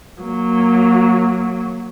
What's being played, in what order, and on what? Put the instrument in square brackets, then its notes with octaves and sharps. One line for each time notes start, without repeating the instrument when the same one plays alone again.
[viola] F#3 A#3